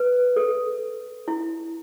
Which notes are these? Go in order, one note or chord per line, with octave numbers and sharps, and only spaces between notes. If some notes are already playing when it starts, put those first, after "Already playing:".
Already playing: B4
A4
E4